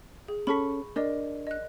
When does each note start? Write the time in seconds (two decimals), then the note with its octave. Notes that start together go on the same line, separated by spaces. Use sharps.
0.28 G#4
0.47 C#4 A4 B5 C#6 B6
0.96 D4 A#4 D5 D#5
1.47 D#5 F#6